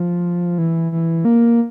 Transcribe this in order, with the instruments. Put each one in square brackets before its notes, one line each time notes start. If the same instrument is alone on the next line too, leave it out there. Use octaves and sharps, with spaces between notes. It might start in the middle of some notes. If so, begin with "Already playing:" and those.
Already playing: [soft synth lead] F3
E3
E3
A#3